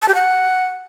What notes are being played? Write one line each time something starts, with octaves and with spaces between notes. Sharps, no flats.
A5
G4
F#5